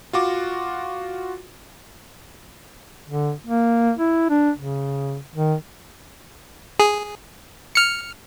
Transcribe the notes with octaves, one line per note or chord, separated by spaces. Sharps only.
F4 F#4 D6
D3
A#3
E4
D4
C#3
D#3
G#4
F6 C#7